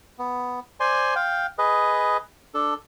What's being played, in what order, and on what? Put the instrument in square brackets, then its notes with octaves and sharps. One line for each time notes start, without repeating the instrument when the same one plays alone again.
[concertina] B3
C5 D5 G#5 C6
F5 G5
G#4 B4 D#5
D4 A4